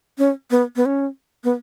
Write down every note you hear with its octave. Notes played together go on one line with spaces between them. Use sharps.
C#4
B3
B3
C#4
B3